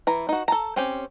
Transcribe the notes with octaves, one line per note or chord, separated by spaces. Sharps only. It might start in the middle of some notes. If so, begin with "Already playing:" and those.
E3 A#5
D#4 F#4
A4 A5 A#5
C4 C#4 G4